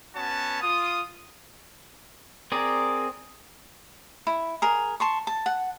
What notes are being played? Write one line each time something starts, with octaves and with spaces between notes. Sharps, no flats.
B3 C#4 F#4 C#5 A5
F4 D#6
C4 G#4 A#4 D5
E4
G#4 A#4
A5 C6 C#6
A5
F#5